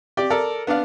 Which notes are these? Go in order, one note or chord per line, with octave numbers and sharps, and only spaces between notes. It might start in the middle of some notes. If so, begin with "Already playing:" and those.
G4 D5
A4 A#4 D5
B3 D4 D5 F5